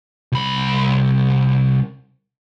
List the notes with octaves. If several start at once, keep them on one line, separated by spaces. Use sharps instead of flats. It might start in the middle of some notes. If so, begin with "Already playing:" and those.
C2 B5